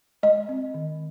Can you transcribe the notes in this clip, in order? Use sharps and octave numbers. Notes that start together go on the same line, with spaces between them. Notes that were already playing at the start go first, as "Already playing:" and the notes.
G#3 D#5
C4
D#3